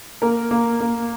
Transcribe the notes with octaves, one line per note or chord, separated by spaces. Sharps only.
A#3 A#4
A#3
A#3